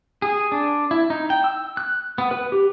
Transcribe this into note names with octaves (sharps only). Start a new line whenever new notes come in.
G#4
D4
E4
D#4
G5
E6
F#6
B3
B4
G4